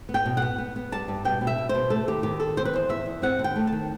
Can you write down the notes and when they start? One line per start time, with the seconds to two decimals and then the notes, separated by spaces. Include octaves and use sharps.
0.09 B3
0.14 G5
0.26 B2
0.37 B3 F#5
0.58 B3
0.76 B3
0.92 G3 A5
1.08 G2
1.25 B2 G5
1.41 B2
1.47 E5
1.58 B2
1.69 C5
1.75 B2
1.90 A3 A4
2.08 D#2 G4
2.23 D#3 G4
2.40 D#3 A4
2.57 C4 C5
2.65 B4
2.73 E2 C5
2.89 E2 E5
3.06 E2
3.22 C4 F#5
3.39 D#2
3.44 G5
3.56 A3
3.67 A5
3.72 D#3